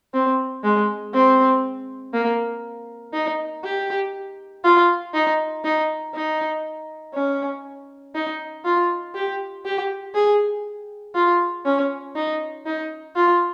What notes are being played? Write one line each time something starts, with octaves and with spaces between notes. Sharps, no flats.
C4
G#3
C4
A#3
D#4
G4
F4
D#4
D#4
D#4
C#4
D#4
F4
G4
G4
G#4
F4
C#4
D#4
D#4
F4